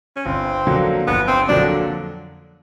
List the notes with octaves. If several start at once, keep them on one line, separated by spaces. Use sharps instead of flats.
C#4
G1 C4
F2 D3 F#3 A#3
G1 B3
C4
F2 D3 F#3 A#3 D4